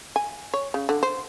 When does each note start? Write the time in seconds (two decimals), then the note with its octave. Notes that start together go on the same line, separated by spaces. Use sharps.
0.16 G#5
0.54 C#5
0.74 C#3
0.89 D3
1.03 C5